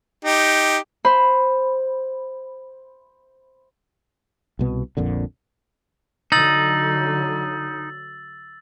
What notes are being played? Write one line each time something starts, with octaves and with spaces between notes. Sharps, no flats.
D#4 G4
C5 B5
C2 B2 B3
A#1 F2 A#2 D3
D3 F#3 D#4 E6 A6 F#7